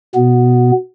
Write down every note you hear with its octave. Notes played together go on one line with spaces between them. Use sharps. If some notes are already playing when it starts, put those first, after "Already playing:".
B2 B3